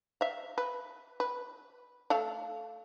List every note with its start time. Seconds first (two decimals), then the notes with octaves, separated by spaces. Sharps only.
0.21 E5 F5
0.58 B4
1.20 B4
2.10 A3 A4 F5